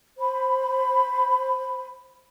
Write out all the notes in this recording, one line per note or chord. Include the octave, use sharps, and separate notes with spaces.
C5 B5